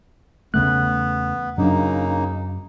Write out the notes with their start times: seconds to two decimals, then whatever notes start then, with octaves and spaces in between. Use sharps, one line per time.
0.54 E2 C#3 A3 B3 F#6
1.58 F#2 C#3 A#3 D4 D#4